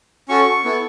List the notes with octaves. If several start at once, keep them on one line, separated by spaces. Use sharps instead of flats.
C#4 F#4 A4 C#6
B3 E4 A4